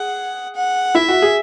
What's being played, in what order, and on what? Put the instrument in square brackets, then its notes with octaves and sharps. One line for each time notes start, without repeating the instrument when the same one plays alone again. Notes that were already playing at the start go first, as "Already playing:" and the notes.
Already playing: [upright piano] G#4 [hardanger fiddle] F#5
[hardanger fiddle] F#5
[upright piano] E4 [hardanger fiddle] E5
[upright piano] F#4
G#4